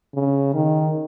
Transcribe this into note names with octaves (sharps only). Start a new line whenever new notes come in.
C#3
D#3